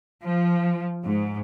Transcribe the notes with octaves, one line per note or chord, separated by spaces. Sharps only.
F3
G#2